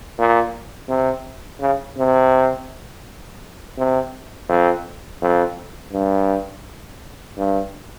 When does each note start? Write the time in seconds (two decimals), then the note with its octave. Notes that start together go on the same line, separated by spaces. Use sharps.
0.18 A#2
0.89 C3
1.61 C#3
1.97 C3
3.78 C3
4.49 F2
5.21 F2
5.92 G2
7.37 G2